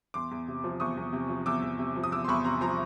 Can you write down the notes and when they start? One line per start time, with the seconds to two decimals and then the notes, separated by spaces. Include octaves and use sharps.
0.14 E2 C6 D6
0.31 E2
0.48 C3
0.64 F3
0.80 E2 C#6 D#6
0.97 E2
1.13 C3
1.29 F3
1.46 E2 D6 E6
1.62 E2
1.79 C3
1.96 F3
2.04 D#6
2.12 E2 D6 E6
2.24 C6
2.28 E2 B5 C#6
2.44 C3 A#5 C6
2.61 F3 A#5 C6